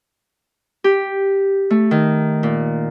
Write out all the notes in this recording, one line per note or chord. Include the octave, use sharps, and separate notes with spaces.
G4
A3
D#3
A#2